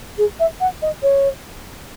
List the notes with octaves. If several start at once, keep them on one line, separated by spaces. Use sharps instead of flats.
G#4
E5
F#5
D#5
C#5